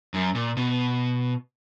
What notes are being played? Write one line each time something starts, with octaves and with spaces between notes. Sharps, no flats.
F#2
A#2
B2